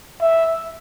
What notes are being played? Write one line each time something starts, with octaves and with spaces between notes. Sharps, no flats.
E5